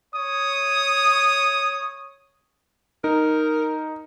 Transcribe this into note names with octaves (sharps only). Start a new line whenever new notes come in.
C#5 D#6
D#4 A#4